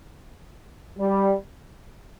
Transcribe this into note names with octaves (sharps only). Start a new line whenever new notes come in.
G3